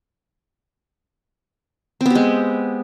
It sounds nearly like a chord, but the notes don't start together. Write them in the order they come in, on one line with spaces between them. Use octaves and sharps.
C4 B3 G4 G#3